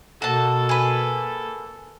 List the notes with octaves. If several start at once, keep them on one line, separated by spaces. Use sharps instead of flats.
B2 A#3 F#4 A4 A5
G#4 B4